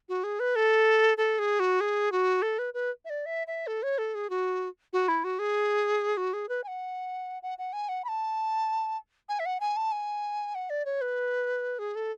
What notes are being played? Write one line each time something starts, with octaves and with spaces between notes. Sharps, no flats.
F#4
G#4
B4
A4
A4
G#4
F#4
G#4
F#4
A4
B4
B4
E5
D5
E5
E5
A4
C#5
A4
G#4
F#4
F#4
E4
F#4
G#4
F#4
G#4
B4
G#5
F#5
F#5
F#5
G#5
F#5
B5
A5
G#5
E5
F#5
G#5
A5
G#5
F#5
D5
C#5
B4
G#4
A4